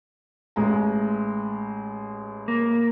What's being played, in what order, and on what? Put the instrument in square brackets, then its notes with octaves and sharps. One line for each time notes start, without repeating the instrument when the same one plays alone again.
[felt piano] A1 G#3 A#5
[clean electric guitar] A#3